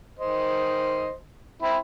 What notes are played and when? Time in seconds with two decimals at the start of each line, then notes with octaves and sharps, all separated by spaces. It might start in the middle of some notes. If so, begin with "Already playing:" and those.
0.19 D#3 C5 D#5
1.62 C4 E4 B5